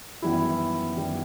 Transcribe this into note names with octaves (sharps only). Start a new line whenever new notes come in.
F#2 D#3 E3 G3 B3 E4
F#2 D#3 G3 B3